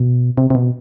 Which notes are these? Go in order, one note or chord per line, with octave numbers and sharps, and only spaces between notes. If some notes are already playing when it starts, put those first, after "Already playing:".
Already playing: B2
C3
C3
B2